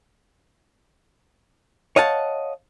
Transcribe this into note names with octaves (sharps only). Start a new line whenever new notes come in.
C#5 D#5 F5 F#5 A5